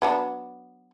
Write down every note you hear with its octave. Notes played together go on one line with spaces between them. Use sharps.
F#3 B3 D4